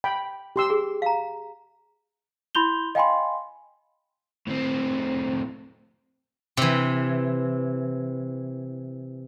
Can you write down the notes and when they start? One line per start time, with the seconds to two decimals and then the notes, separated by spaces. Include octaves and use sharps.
0.04 G5 B5
0.56 G4 C6 E6
0.70 G#4
1.02 F5 A#5
2.55 E4 B5 C6 G6 F7 G7
2.95 D#5 F5 G5 G#5 B5 C6
4.47 A2 C4
6.57 C3 E3